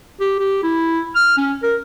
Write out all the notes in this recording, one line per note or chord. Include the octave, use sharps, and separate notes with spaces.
G4
G4
E4
F6
C#4
A#4